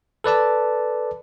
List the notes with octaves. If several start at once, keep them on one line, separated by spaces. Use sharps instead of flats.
A4 B4 D5 A5